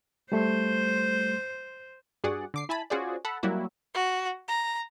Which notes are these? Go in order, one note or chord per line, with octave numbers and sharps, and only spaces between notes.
G3 A3 C5
G2 F#4 G#4 D5 F#5
D3 D6 C7
E4 G#5 A5 B5
C#4 F4 F#4 G#4 C5 D5
A4 F#5 A5 B5
F#3 G3 A#3 E4 F#4
F#4
A#5